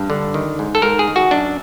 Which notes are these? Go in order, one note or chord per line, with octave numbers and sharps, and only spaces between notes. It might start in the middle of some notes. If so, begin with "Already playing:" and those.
Already playing: G2
D3
D#3
G#2
A4
G#2 A#4
G#4
D#3
F#4
F#2 D4